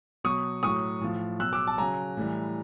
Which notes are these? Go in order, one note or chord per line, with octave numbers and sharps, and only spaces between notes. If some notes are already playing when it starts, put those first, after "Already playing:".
B2 F#3 C#6 D#6
A2 F#3 C#6 D#6
A2 F3
B2 F#3 E6 F#6
D6 E6
A5
C#3 F#3 G#5 A#5
A2 E3 G3